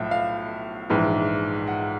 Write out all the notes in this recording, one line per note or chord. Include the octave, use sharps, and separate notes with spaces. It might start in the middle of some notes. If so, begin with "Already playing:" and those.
Already playing: B1 A2 F3 E5
F5
A#1 G#2 E3
F#5